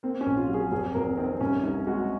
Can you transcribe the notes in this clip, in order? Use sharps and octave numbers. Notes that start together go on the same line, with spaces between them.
A#3 C4
C#4
A#1
F4
F#3
G#4
F1 G#4
F1 A#4
D#3 C4
C2 C#4
C2 D#4
G#3 F#4